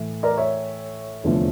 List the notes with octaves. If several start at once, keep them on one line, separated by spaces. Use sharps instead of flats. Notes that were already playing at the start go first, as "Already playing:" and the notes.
Already playing: A2 E3 A3
A#4 D5
C#5 E5
F1 E2 D3 F3 A3